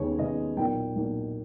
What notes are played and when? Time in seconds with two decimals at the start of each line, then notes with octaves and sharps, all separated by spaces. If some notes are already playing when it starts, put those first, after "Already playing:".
Already playing: D#2 C#3 G#3 B3 C#5
0.18 D#2 C#3 G#3 B3 D#5
0.57 B1 A#2 A#3 G5
0.96 B1 A#2 A#3